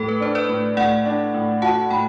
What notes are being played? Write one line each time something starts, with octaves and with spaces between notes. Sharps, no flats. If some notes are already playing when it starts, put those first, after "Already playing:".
Already playing: A2 A4
B4
D4 C5
B4 D5
A2
A2 D5 F#5
D4
A2
F#4 F#5 A5
A2 G5 B5